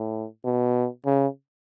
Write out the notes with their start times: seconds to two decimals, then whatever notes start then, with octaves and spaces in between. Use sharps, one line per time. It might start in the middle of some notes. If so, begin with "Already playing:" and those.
Already playing: A2
0.45 B2
1.06 C#3